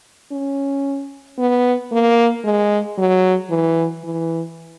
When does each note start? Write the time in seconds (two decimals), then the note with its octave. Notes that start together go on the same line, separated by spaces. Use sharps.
0.31 C#4
1.38 B3
1.92 A#3
2.44 G#3
2.98 F#3
3.50 E3
4.04 E3